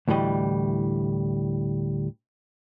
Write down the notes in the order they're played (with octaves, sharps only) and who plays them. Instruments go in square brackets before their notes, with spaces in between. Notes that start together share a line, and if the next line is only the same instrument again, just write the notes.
[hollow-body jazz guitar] D2 A2 E3 G3 D#5